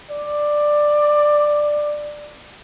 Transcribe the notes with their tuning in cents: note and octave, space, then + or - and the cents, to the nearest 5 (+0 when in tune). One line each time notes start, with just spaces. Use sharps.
D5 +10